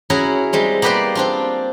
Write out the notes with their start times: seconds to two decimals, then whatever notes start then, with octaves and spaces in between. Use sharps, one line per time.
0.10 C#4 E4 F#4 G#4 A#4
0.53 G3 G#3 C4
0.82 A#3 B3 G4 B4 C5 D5
1.15 C4 D4 F4